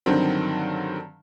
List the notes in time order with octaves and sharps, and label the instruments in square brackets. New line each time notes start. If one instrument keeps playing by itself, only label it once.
[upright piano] G2 D3 D#3 F#3 C4